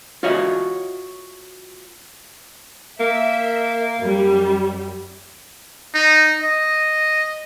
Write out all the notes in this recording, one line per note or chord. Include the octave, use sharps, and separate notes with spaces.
F4 F#4 C#5 D#5 E5
A#3 E5
F#2 G3
D#4
D#5